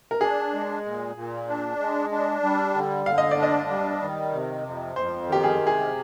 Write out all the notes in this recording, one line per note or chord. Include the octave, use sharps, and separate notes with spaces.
A#4
D4 G#4
G#3
A#2
A#2
D4
G#3
D4
G3
D3
D3 F5
D#5
D5
D4
D#5
G3
D#3
C3
F2
F2 C5
D#3 G4
G#4
C3
G#4